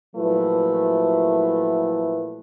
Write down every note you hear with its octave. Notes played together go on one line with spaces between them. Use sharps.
A#2 F3 F#3 A3 E4 B4